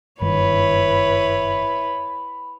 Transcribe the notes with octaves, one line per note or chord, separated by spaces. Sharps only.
F#1 G2 D#3 E4 B4 C#5 B5